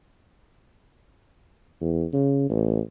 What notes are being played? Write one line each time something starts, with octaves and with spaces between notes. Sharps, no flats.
E2
C#3
A1